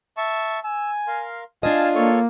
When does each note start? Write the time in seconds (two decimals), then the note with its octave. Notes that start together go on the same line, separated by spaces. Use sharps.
0.17 E5 A5 C#6
0.64 G#5 E6
1.07 A#4 F5 C6
1.63 D4 F4 D#5 F5 G#5 A5
1.95 A#3 A4 C#5 C#6